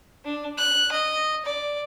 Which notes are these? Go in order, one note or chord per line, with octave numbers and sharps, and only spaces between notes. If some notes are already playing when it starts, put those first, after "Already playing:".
D4
F#6
D#5
D5